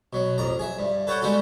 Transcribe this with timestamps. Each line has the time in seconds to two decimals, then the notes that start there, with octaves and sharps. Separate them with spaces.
0.13 B2 F#3
0.38 A1 F2 A#5
0.59 G#4 E5
0.78 G2
1.07 A4 B4 C#5 F#5 G5
1.21 G3 G#3 B3 D#4 F#4 A4